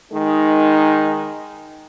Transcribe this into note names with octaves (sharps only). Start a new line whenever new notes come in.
D#3 G#3 D#4